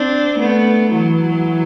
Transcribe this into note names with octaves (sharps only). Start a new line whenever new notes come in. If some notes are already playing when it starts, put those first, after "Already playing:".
Already playing: C4 D4
A3 B3
E3 F#3